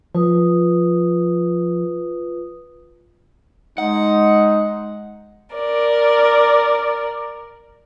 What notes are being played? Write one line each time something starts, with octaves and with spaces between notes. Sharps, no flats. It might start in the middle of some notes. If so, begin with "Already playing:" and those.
F3 F4 B4 D#6
G#3 D#4 F#5
A#4 D5